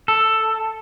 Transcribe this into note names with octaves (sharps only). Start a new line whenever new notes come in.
A4